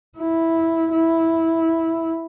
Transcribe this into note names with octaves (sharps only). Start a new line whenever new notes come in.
E4
E4